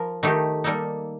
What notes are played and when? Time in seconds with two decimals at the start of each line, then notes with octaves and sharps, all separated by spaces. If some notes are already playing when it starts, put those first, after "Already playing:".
Already playing: F3 A#4
0.23 D#3 A3 D#4 G4
0.64 G3 A#3 D#4 A4